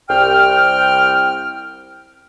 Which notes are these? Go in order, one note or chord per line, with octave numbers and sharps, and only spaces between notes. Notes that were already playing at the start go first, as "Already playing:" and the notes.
C2 G5 F6